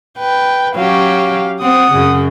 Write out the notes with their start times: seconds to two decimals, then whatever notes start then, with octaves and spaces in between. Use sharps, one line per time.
0.19 B4 G5
0.76 F#3 C#4 G4 F5
1.61 C4 F#5 D#6
1.92 F#2 C#3